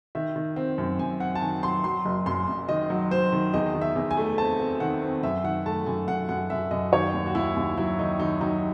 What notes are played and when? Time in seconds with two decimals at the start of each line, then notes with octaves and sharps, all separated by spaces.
0.15 D#3 E5
0.36 D#3
0.56 C4
0.78 F#2
0.99 F#2 G#5
1.20 C4 F#5
1.35 A5
1.41 D#3 G#5
1.63 F#3 C6
1.84 F#3 C6
2.05 F#1
2.26 F#2 C6
2.48 F#2
2.69 D#3 D#5
2.90 F#3
3.11 F#3 C5
3.33 D#3
3.54 E2 D#5
3.74 D#3
3.81 E5
3.96 E2
4.11 G#5
4.17 A3
4.38 C4 A5
4.60 C4
4.80 D#3 F#5
5.02 C4
5.23 F#2 E5
5.44 D#3 F#5
5.66 A3 A5
5.86 F#2 G#5
6.08 F#2 F#5
6.29 F#2 F#5
6.50 F#2 E5
6.71 F#2 D#5
6.92 D#3 C#5
7.14 D#2
7.26 F#4
7.34 D#2 E4
7.57 D#2
7.77 F#3 E4
7.99 D#3 D#4
8.20 D#3 D#4
8.41 F#3 D#4